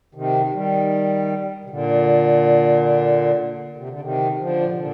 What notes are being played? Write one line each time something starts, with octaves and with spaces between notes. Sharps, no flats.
C3 D#3
D#3 G3
C3
A#2 D3
C3
D3
C3 D#3
D3 F3
A#2
C3
A#2 D3